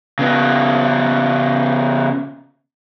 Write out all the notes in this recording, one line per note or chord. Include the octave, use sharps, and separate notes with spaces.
C#3 B3